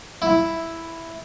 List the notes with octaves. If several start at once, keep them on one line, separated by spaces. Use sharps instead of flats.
E4